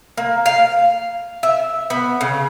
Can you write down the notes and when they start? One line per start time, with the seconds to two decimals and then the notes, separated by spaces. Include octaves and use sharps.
0.18 A#3
0.46 F5
1.43 E5
1.90 B3
2.21 C#3